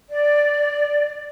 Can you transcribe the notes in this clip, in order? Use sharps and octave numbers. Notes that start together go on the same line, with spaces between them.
D5